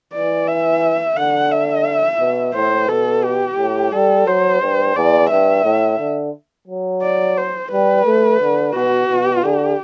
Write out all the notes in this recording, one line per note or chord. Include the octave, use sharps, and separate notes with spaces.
E3 D5
E5
D3 F#5
E5
B2
A2 C5
B2 A4
G4
A2
G3 A4
F#3 C5
G2
E2 D5
G2 E5
A2
D3
F#3
D5
C5
G3 B4
A3
D3
B2 F#4
B2
D3 G4